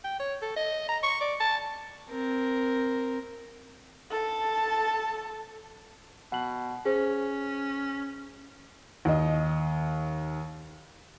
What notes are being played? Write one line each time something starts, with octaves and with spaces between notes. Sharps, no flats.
G5
C#5
A4
D#5
A#5
C#6
D5
A5
C4 A#4
A4 A5
B2 F#5 F#7
C#4 G#4 C5
D#2 D#5